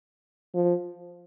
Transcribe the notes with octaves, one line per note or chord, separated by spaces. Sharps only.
F3